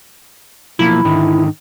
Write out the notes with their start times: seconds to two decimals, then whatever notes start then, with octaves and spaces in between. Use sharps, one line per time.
0.79 B1 F3 A#3 E4
1.05 G#2 D3 D#3